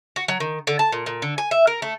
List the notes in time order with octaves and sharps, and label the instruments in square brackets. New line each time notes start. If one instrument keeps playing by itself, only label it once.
[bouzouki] F#4
F#3
D#3
D3
A5
A#2
A#2
D3
G#5
E5
A#4
A3